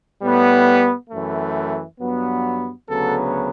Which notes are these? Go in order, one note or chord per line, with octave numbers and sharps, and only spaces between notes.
A2 G3 B3
F#2 E3 A3
G2 F#3 B3
D2 C#3 F#3 B3 A4